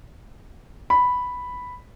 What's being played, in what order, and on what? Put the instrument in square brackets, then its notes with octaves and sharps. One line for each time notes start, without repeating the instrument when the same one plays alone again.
[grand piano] B5